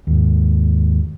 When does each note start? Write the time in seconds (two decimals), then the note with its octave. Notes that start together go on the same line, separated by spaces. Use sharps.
0.07 D#2 G#2